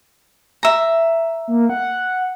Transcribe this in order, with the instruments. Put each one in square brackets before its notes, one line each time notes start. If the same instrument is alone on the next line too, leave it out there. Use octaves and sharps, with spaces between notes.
[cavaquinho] E5 A#5
[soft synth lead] A#3
F#5